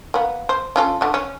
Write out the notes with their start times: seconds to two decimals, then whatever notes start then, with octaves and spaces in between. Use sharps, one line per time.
0.14 A#3 B3
0.49 C5
0.76 C#4 F4 A4
1.01 D3 A3
1.14 C#4